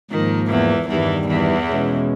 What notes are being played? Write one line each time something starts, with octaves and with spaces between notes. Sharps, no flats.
G#2 D#3 F3 A#3
E2 E3
E2 G2 D#3 E3 G3
E2 E3
B2 G#3 C#4